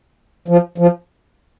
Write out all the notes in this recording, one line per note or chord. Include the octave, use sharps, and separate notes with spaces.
F3
F3